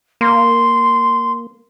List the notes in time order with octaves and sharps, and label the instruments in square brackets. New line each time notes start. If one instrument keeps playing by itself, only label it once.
[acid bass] A#3 [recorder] C6